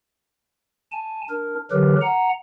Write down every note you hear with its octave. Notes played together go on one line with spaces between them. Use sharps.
G#5 A5
D4 A#4
D3 E3 F#3 G4 A#4 B4
F#5 A#5